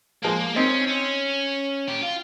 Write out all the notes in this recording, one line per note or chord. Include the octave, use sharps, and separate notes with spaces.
F3 G#3 A#3
C4 C#4 D#4
C#4
G4
F4